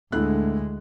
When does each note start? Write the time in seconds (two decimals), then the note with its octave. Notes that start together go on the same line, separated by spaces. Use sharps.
0.12 D2 A2 D3 G#3 A3 E4 F#6